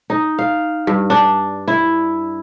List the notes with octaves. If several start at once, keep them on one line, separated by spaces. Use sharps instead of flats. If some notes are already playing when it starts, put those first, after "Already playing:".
D#4
F5
G2
D4
E4